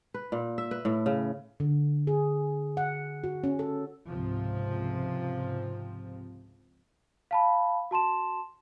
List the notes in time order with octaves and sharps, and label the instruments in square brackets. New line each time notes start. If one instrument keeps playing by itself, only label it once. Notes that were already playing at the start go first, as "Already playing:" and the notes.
[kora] B4
A#2
E5
B4
A2
C#3
[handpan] D3
G#4
F#5
F#4
C#4
A4
[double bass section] C#2 G#2 C3 F3 C4
[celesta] F5 A5 B5
F#4 A5 C6 E7